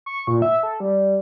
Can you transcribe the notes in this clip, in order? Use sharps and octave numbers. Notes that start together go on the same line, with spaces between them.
C#6
A#2
E5
A4
G3